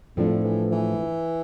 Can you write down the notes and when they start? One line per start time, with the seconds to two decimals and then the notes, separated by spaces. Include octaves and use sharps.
0.17 F2 A2 F3 A3 D4
0.44 E3
0.72 E3